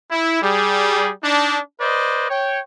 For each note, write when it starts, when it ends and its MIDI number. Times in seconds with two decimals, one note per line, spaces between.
0.11 0.40 64
0.42 1.11 55
0.42 1.11 68
1.23 1.59 62
1.23 1.59 63
1.80 2.28 71
1.80 2.28 72
1.80 2.28 74
1.80 2.28 75
2.29 2.60 73
2.29 2.60 79